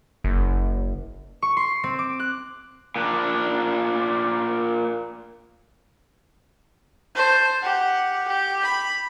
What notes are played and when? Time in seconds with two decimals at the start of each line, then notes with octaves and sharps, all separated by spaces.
0.24 F#1
1.42 C#6
1.57 C6
1.84 C4
1.99 D6
2.19 F#6
2.96 A#2 D4
7.15 C5 A5
7.62 G4 F#5
8.28 G4
8.62 B5